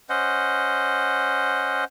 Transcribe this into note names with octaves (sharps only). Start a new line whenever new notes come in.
C#4 C5 D#5 F#5